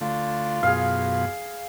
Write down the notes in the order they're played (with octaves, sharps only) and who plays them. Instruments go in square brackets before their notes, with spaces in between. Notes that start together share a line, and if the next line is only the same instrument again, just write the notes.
[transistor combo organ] D3 A3 [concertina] F4
[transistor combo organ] F#2 B2 [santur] G#4 F5